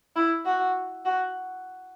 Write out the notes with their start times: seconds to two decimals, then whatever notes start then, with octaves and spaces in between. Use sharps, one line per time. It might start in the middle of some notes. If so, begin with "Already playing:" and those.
0.16 E4
0.45 F#4
1.05 F#4